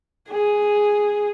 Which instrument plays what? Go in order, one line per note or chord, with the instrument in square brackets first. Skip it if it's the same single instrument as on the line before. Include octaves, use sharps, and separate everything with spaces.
[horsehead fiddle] G#4